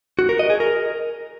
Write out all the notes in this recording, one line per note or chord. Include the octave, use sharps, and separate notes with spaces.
F#4
A#4
D#5
G#4
A#4